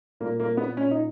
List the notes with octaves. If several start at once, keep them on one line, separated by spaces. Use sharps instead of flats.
A#2 A#3
A#3
B3
A#2 C#4
D#4